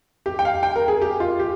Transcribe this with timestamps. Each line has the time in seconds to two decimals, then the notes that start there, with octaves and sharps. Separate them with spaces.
0.26 G4
0.39 G5
0.45 F5
0.63 G5
0.76 A#4
0.88 G#4
1.02 G4
1.20 F4
1.40 G4